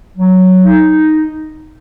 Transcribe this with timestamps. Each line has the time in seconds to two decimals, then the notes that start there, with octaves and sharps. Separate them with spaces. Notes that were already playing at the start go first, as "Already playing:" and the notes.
0.17 F#3
0.63 D#4